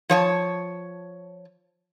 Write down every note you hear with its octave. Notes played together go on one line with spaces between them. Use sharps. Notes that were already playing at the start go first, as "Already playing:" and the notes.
F3 C#5 G#5 A5